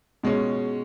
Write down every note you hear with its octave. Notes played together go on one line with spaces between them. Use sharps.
B2 G#3 C#4